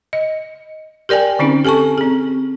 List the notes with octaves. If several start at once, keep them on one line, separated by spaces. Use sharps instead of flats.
D#5
G4 A#4 D5 G5 G#5
D3 C4 C#4 D#4
G4 A4 G#5 A5 C#6
C4 G#4